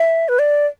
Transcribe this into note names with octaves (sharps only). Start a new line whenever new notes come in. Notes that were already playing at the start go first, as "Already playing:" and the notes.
Already playing: E5
B4
D5